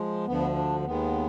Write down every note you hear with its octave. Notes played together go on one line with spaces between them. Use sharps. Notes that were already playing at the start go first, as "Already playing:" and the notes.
Already playing: F3 G#3
D2 D3 F3 B3
D4
D#2 D#3 G#3 B3